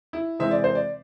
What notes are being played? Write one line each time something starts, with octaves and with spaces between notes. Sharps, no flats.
E4
C3 E3 G#3 C4 E5
D5
C5
D5